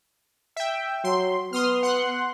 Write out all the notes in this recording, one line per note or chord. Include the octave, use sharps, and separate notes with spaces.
E5 G5
F#3 C6
B3 C6 D#6 F6
F#5 C6 F#6